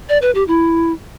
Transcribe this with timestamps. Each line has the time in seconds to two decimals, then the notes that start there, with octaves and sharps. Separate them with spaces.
0.09 D5
0.22 B4
0.35 G4
0.48 E4